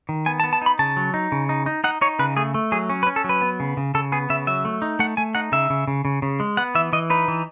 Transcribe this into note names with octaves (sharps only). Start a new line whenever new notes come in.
D#3
B3 G#5
A5
B3
A5
D#4 B5
C#3 A5
F#3
D#4
C#3
D#4
D#4
D#4 F#5
D#4 C#5
C#3 B4
A3 G#4
A3
F#3 G#4
C#4
B4
C#4
A4
F#3
B4
B3
C#3
C#3
C#3 A4
B3 G#4
C#3 E5
F#3 E5
A3
D#4
A3 F#5
A3 G#5
D#4 F#5
C#3 E5
C#3
C#3
C#3
C#3
G#3
B3 F#5
E3 E5
E3 D#5
D#4 B4
E3